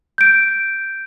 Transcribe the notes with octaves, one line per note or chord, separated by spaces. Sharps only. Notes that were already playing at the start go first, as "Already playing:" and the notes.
G6 D7